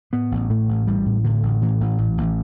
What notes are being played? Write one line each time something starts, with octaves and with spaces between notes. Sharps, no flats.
A2 B3
A1
A2 A3
A1
A1 G3
A2
A2 D3
A1
A2 E3
A1
A1
A1